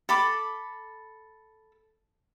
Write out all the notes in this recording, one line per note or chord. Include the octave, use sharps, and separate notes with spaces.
A4 B5 D6